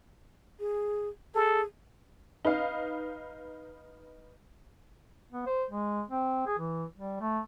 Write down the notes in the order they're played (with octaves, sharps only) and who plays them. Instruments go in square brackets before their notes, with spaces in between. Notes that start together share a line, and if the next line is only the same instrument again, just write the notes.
[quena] G#4
[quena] G#4 [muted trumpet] A4
[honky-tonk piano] D#4 B4 D#5 F5
[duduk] B3
C5
G#3
C4
G#4
E3
G3
A3